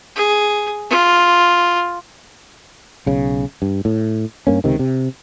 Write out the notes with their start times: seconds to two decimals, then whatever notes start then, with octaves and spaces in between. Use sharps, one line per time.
0.16 G#4
0.90 F4
3.06 B1 C#3
3.62 G2
3.85 A2
4.47 G2 A#3 C#4
4.64 C#2 C3 D#3
4.79 C3